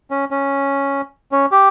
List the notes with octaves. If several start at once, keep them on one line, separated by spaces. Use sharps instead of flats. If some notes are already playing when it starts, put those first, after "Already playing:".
C#4
C#4
C#4
G4